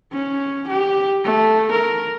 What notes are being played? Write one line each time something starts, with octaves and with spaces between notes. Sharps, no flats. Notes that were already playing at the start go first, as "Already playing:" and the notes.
C#4
G4
A3
A#4